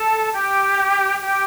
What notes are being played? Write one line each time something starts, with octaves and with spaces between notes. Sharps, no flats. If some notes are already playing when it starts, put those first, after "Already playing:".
Already playing: A4
G4
G4